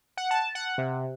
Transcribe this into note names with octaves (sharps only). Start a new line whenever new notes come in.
F#5
A5
F#5
C3